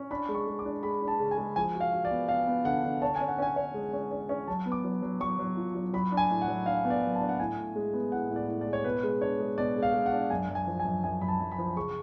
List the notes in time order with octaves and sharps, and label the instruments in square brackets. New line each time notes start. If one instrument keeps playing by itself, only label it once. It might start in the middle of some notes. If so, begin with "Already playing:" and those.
Already playing: [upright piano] C#4
[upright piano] D4 [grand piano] B5
[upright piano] G#3
[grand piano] C#6
[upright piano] G#3
[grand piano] D6
[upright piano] D4
[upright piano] G#3 [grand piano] B5
[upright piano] D4
[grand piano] A5
[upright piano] C#3
[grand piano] G#5
[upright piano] G#3
[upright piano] F3 [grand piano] G#5
[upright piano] F#4
[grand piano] F5
[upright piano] F#4
[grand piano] D5
[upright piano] B3
[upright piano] B3 [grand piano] F5
[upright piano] B3
[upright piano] D3 [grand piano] F#5
[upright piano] D3
[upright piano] C#5 [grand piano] A5
[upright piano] C#4 [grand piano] G#5
[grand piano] F#5
[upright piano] C#4 [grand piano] G#5
[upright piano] C#5
G#3
C#4
C#4
C#4
[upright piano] F#3 [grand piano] A5
[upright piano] B3
[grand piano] D6
[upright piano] F#3
F#3
[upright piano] F#3 [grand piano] C#6
[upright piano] F#3
F4
F#3
[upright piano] F#3 [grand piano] B5
[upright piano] D4
[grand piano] G#5
[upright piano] A2
[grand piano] F#5
[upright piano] F#3
[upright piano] D4 [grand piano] F5
[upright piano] B3
[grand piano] D5
[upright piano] F#3
[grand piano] A5
[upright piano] D4
[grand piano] F#5
[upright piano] A2 [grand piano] G#5
[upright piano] A2
G#3
B3
[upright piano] A2 [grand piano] F#5
[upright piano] A2
[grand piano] D5
[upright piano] A2
[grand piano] D5
[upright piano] G#3
[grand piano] C#5
[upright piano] B2 [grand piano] B4
[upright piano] G#3
[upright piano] D4 [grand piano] C#5
[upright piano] G#3
[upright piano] B2 [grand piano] D5
[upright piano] G#3
[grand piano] F5
[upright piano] G#3
[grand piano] F#5
[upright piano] D4
[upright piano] F#2 [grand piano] G#5
[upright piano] F#2
[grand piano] G#5
[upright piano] F3
[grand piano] G#5
[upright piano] F#2
[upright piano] F#2 [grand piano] G#5
[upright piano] F#2 [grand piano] B5
[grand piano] A5
[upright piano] F#2
[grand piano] B5
[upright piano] F3
[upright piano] C#3 [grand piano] C#6